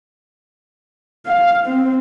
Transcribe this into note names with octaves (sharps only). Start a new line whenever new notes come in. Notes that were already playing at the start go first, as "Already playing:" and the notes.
F5
C4